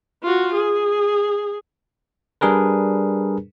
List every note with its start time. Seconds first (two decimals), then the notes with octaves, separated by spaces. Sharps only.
0.23 F4 F#4
0.53 G#4
2.41 G3 D4 G#4 A#4 B4